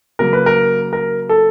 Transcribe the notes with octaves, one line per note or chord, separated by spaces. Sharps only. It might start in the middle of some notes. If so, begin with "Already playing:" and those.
C#3 F#3 A#3 A#4
B4
A#4
A#4
A4